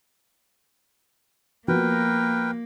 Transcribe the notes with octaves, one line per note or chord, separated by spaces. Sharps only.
F3 A#3 B3 F#4 A#4 B4 G5